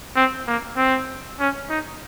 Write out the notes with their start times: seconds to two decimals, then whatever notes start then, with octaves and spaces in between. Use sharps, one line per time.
0.15 C4
0.47 A#3
0.77 C4
1.39 C#4
1.69 D#4